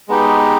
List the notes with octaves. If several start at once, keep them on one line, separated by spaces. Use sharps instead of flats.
G#3 B3 D#4 G4